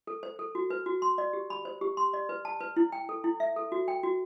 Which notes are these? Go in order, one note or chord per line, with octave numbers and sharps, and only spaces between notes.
A4
C5
A4
F#4
B4
F#4
C6
D5
G4
B5
C5
G4
C6
D5
B4
A5
B4
E4
G5
A4
E4
E5
A4
F#4
G5
F#4